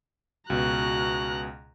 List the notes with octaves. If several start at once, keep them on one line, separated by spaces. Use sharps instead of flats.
C#2 B2 F#4 A#5 F#6